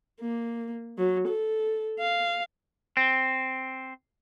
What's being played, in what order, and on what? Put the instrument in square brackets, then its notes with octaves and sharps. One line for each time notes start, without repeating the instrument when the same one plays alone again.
[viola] A#3
F#3
A4
F5
[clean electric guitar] C4